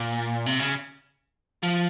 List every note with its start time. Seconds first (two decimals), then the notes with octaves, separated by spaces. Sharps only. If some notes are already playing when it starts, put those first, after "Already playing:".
Already playing: A#2
0.46 C3
0.59 C#3
1.63 F3